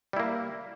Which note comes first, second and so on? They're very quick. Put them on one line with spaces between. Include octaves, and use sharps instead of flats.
G3 E4 A#3